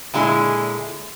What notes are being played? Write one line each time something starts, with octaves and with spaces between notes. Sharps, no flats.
A#2 D3 G#3 E4 G#4